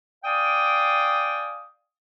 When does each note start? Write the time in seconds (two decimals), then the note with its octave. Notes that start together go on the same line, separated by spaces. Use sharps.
0.24 D5 F5 G5 G#5 D6 D#6